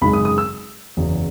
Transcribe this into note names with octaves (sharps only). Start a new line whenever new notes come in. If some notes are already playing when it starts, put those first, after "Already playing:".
G#1 F#2 C#3 G#3 D#4 B5
D#6
D#6
E6
F#1 E2 C#3 F#3